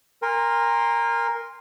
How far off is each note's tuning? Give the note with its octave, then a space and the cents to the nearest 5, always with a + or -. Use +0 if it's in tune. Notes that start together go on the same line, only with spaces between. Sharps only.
A#4 +0 G#5 -40 C6 +0